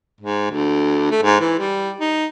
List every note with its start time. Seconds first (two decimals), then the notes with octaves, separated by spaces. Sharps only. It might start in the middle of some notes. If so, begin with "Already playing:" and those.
0.21 G#2
0.51 D2
1.11 A3
1.23 G#2
1.40 E3
1.59 G3
2.00 D#4